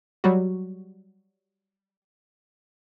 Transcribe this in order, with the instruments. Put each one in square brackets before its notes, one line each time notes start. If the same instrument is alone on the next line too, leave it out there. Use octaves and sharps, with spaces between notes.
[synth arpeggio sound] F#3 G3 F#4